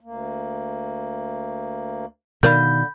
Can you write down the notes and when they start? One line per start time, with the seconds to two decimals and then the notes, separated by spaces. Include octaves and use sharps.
0.01 D2 A#3
2.43 B2 D3 D#3 A#4 D5 F5 B5 G6